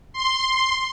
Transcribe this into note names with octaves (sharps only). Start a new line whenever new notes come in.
C6